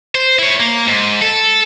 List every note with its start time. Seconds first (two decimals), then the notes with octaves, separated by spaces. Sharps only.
0.15 C5
0.39 E4 C#5
0.60 A#3
0.88 G#2
1.22 A4